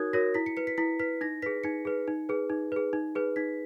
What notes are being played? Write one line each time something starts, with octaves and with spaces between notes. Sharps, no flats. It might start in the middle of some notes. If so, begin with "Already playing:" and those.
Already playing: D#4 F#4 A#4 C#5 D#6 F#6 G#6
F#4 A#4 C#5 A#6
E4 B6
C#7
B4 C#7
B6
E4 B6
B4 B6
D#4 A#6
G#4 B4 B6
D#4 C#7
G#4 B4
D#4
G#4 B4
D#4
G#4 B4
D#4
G#4 B4
D#4 B6